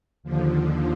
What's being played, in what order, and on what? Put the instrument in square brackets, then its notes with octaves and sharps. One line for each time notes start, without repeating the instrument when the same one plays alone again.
[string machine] D#2 D3 F3